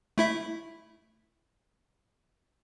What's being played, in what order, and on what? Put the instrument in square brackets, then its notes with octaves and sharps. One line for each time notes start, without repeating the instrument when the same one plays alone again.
[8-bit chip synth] A3 E4 E5